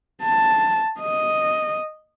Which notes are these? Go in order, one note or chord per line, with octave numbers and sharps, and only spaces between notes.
A5
D#5